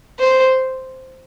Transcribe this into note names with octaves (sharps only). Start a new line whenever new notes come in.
C5